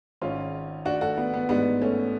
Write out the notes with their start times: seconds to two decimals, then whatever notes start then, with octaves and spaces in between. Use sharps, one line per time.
0.22 G#1 G#2 C#4 F4
0.85 D4 F#4
1.01 F#4 A4
1.18 B3 D4
1.34 B3
1.49 A1 G#2 B3 D4
1.82 A3 C#4